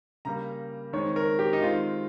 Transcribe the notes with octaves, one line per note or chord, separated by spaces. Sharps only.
C#3 G3 A#3 A#5
D#3 G#3 C4 C#5
A#4
G4
D#4
D#3 G#3 C4 F4